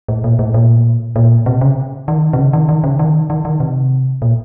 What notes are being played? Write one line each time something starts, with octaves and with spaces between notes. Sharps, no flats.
A2
A#2
A2
A#2
A#2
C3
C#3
D#3
C3
C#3
D#3
D#3
C#3
D#3
D#3
D#3
C3
A#2